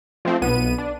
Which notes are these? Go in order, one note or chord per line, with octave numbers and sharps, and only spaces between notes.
F3 A3 C4
B1 B3 D#7
D4